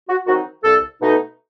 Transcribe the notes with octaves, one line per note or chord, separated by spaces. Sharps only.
F#4
D#3 F#3 C4 D#4 F#4
C2 A4
B2 A3 D#4